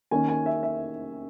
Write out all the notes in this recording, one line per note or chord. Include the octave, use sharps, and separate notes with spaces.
D#3 A#3 C#4 G#5
G#5
E5
E5